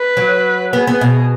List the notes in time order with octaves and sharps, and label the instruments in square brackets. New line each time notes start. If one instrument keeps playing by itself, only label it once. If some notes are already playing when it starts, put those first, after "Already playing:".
Already playing: [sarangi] B4
[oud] F#3
[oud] B3 [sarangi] G#4
[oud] B3
B2